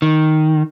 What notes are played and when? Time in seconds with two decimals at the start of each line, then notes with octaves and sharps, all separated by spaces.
0.02 D#3